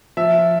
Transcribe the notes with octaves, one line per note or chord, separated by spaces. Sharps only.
F3 E5